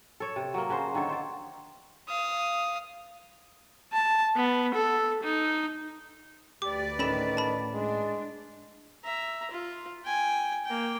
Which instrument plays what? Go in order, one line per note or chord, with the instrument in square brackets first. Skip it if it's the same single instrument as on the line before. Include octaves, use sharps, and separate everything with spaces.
[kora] A4 C#5
C3
F#3 A#3
C#3 F#4 C5
D3 D#3 A4 C#5
C5 D5
[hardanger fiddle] F5 D#6
[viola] A5
B3
A4
D#4
[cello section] D2 B4 D5 [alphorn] G4 [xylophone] D6
[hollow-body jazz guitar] A2 C#4 [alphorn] D#3 [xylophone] A4 B5 E7
[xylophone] A5 B5
[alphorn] G#3 [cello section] D4
[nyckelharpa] E5 A#5
F4
G5 G#5
A#3 G5